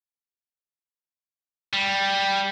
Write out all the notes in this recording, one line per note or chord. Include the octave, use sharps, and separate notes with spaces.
G3